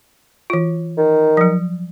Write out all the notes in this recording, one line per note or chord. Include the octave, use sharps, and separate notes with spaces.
E3 F4
D#3
F3 F#3